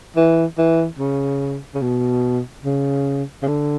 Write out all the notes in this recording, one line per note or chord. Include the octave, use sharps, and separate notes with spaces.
E3
E3
C#3
C#3
B2
C#3
C#3
D3